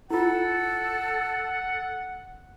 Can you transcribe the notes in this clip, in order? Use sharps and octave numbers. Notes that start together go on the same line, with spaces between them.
E4 F4 A4 F#5